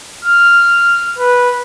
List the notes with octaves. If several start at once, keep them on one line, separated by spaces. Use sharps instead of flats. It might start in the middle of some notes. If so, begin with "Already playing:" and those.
F6
B4